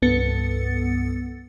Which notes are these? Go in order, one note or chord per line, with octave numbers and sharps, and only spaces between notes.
C2 G2 B3 A4 A6 C#7